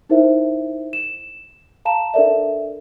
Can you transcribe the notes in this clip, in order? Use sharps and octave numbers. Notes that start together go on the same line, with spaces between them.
D#4 E4 A#4 C5 E5
E7
F5 A5 A#5 E7
D4 A4 A#4 D5 E5